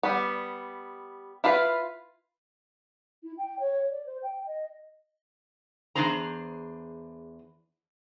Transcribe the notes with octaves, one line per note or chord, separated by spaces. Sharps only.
G3 B3
E4 F4 B4 F5
E4
G5
C#5
D5
C5
G5
D#5
E2 G#3 D4 G#4 C5 A#5